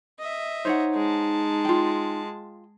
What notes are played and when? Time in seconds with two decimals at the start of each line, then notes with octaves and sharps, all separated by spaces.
0.19 D#5 E5
0.65 D#4 C5 C#5 F#5
0.94 G#3 A5
1.65 F4 G5